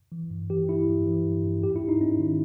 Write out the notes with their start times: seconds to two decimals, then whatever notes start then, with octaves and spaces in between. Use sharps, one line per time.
0.12 E3
0.31 G2
0.50 E3 G4
0.69 G2 E4
0.88 G2
1.07 E3
1.25 G2
1.44 G2
1.63 G#2 G4
1.76 E4
1.81 G#2
1.89 D#4
2.00 G#2 C#4
2.19 D#3